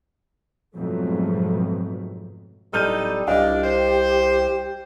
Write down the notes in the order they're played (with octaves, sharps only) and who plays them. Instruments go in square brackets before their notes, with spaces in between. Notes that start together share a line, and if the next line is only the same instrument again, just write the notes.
[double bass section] F2 G#2 B2 F#3 A3
[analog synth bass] D1 [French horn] G3 [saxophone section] D#4 A4 [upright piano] F6 G6 D#7
[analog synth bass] C2 [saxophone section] F3 D4 [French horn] G4 [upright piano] D#5 F5
[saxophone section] C5